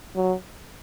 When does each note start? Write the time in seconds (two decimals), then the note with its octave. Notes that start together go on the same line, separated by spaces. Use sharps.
0.16 F#3